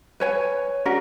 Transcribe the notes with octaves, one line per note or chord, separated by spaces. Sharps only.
B4 C#5 G#5
C#4 D4 F#4 A#4